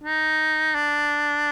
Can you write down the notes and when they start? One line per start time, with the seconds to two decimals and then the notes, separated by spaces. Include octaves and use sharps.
0.04 D#4
0.75 D4